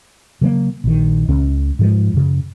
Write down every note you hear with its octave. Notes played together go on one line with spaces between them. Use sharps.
C#3 F#3 G3 A#3
A#1 D#3
C#2 C#3 C#4
G#2 F3 G#3
F#2 C#3